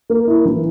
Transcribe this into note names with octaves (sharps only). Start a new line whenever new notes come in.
A#3
E4
E3